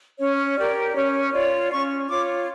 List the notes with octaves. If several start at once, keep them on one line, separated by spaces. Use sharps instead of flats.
C#4 C#5
G4 A#4 D5
C#4 C#5
F4 C#5 D5
C#4 C#6
F4 C#5 D6